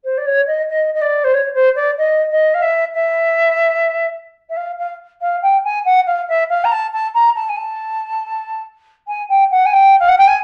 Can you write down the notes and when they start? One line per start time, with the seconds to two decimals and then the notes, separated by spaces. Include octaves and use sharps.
0.04 C5
0.17 D5
0.25 C#5
0.47 D#5
0.68 D#5
0.94 D#5
1.01 D5
1.24 C5
1.33 C#5
1.54 C5
1.75 D5
1.98 D#5
2.30 D#5
2.54 F5
2.61 E5
2.94 E5
4.49 E5
4.56 F5
4.78 F5
5.21 F5
5.42 G5
5.64 G#5
5.85 F#5
6.06 F5
6.28 E5
6.49 F5
6.64 A#5
6.71 A5
6.92 A5
7.14 A#5
7.35 A5
7.49 G#5
7.56 A5
9.07 G#5
9.29 G5
9.51 F#5
9.65 G#5
9.73 G5
9.99 F5
10.08 F#5
10.18 G5
10.27 G#5